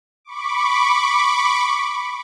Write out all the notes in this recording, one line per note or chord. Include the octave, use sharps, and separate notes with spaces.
B5 C#6 D6